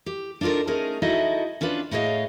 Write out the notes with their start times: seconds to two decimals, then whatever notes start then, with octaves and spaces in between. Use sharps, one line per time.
0.06 G4
0.41 D4 D#4 F4 A4 A#4
0.67 A3 C#4 D#4 G#4 A#4
1.02 D#4 E4 F#4 A4 D#5 E5
1.61 C#4 D4 F4 B4
1.91 A2 A3 G#4 C#5 D#5 F5